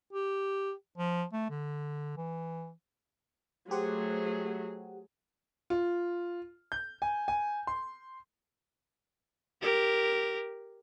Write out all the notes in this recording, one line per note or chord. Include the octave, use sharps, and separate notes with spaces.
G4
F3
A3
D3
E3
F#3 A3 G4 G#4 C5 F#5
F4
G6
G#5
G#5
C6
G4 A#4